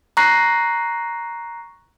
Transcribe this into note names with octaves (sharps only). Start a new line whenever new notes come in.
A#5 C#6 F#6 A#6 C7